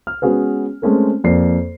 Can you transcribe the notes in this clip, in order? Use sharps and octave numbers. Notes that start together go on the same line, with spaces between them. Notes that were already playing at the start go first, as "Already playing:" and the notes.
F6
G#3 B3 C#4 F#4 G#4 B4
G#3 A3 C4 C#4 A4 A#4
F2 A#3 D5 C7